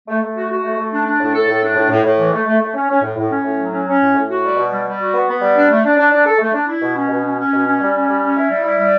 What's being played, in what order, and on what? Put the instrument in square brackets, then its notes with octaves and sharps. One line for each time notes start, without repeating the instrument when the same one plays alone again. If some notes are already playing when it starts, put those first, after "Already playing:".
[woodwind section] A3
A3
F#4
F#4
A3
A3
D4
D4
A2
A4
A2
D4
A2
A2
A2
E3
A3
A3
A3
C#4
C#4
A2
A2
C#4
A2
F#3
C#4
C#4
A2
A2
F#4
G3
B2
G3
G3
F#4
B3
B3
G3
D4
A3
D4
D4
D4
A4
A3
D4
E4
B2
C#4
B2
C#4
C#4
B2
C#4
G3
C#4
G3
C#4
E4
G3
E4
G3